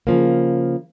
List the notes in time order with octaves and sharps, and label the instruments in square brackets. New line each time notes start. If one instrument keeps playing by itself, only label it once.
[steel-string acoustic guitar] C#3 F3 A#3